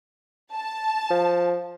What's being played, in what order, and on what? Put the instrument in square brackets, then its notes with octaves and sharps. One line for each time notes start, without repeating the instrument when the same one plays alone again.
[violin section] A5
[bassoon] F3